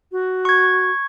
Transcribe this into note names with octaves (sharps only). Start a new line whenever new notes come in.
F#4
C#6 G#6